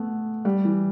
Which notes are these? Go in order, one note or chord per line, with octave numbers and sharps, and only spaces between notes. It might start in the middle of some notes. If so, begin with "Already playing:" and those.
Already playing: A3 B3
G3
E3